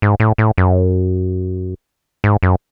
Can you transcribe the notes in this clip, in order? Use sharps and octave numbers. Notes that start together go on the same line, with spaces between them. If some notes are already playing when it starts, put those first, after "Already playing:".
G#2
A2
A2
F#2
G#2
F#2